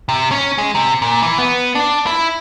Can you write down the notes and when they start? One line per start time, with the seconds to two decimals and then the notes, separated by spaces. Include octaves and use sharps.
0.09 C3
0.31 C#4
0.58 G#3
0.75 C3
1.02 A#2
1.22 E3
1.38 B3
1.75 D4
2.07 E4